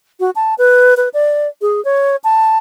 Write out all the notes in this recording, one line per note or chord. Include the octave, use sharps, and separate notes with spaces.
F#4
A5
B4
B4
D5
G#4
C#5
A5